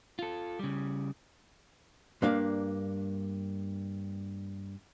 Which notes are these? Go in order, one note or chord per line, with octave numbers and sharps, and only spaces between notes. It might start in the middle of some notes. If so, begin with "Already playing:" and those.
F4 A4
C#3 G3
G2 A#3 D4 F5